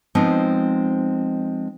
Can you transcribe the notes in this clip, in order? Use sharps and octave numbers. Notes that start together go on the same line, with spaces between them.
F3 G#3 B3 C4 D#4